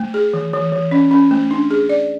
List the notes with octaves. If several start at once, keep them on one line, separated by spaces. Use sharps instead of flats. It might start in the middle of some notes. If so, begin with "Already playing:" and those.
Already playing: A3
G#4
E3
E3
E3
C#4
C#4
A3
D4
G#4
D5